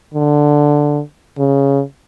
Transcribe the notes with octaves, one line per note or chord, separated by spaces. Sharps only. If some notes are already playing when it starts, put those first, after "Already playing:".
D3
C#3